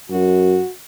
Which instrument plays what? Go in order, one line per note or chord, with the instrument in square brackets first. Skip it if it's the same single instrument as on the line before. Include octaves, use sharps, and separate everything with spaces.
[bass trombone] F#2 [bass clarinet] F#4